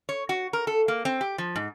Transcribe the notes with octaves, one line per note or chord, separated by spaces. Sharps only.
C#5
F#4
A#4
A4
A#3
C4
G4
F3
G#2